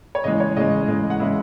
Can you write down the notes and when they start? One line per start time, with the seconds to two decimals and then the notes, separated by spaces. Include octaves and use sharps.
0.15 C#5
0.24 C#3 E3 G#3 D#5
0.40 C#5
0.56 C#3 E3 G#3 D#5
0.88 C#3 E3 G#3
1.10 F#5
1.19 C#3 E3 G#3 E4 E5